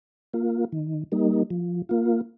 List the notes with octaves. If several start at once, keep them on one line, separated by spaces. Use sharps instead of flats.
A#3 F4
D#3
G3 A#3 D#4
F3
A#3 F4